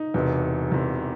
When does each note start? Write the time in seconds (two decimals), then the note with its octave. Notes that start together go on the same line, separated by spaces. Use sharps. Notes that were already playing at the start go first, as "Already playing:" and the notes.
Already playing: D#4
0.14 E1 E2 C3
0.70 E1 E2 C3